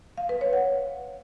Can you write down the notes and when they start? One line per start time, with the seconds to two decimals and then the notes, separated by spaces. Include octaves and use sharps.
0.18 F5
0.29 B4
0.41 C#5
0.53 F#5